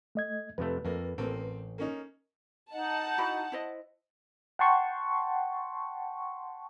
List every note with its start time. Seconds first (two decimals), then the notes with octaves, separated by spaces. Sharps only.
0.15 A3 D#5 G#6
0.58 F2 C3 A3 B4
0.85 F2 A3 A#3
1.18 A1 A#3 C4 A4
1.78 A#3 C#4 D#4
2.73 D#4 D#5 F#5 A5
3.18 E4 F#4 B5
3.52 E4 C5 D#5
4.59 F#5 G5 A5 C6 C#6